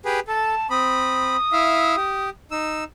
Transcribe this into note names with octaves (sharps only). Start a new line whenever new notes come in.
G4 G#4 B4
A4 A5
C4 B5 D#6
E4 E5 F5
G4
D#4 E6